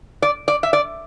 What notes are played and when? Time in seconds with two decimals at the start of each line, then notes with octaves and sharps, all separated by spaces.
0.22 D5
0.48 D5
0.63 E5
0.73 D5